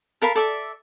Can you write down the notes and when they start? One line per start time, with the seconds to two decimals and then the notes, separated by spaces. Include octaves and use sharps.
0.22 A4 A#4 F5 B5
0.35 A4 D5 E5